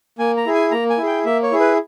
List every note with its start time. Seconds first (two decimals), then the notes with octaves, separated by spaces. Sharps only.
0.19 A#3 G#5
0.37 A#5
0.46 E4 G#4
0.54 G#5
0.71 A#3 A#5
0.90 G#5
0.98 E4
1.03 G#4 G5
1.25 A#3 E5
1.43 C#5
1.51 E4 G#4
1.60 B4